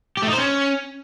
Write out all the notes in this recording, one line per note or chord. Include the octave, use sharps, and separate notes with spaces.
G4
A3
D#4
C5
C#4